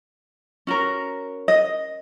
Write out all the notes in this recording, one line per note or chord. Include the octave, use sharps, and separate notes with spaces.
C#4 F#4 A#4
D#5